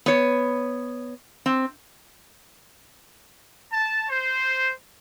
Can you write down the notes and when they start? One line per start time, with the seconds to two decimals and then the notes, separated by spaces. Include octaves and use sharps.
0.06 B3 C#5
1.46 C4
3.73 A5
4.09 C5